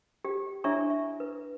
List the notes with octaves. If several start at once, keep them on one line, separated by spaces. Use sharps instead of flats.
G4
D4 E4 C#5 E5 G#5 C#6
E5
B4